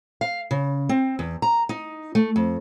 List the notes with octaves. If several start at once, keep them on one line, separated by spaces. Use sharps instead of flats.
F5
C#3
C4
E2
A#5
D#4
A3
F2